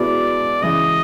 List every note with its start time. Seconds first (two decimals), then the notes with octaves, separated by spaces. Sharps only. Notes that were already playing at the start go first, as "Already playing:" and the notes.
Already playing: B2 G#3 B3 E4 D5
0.61 C#3 E3 G#3 D#5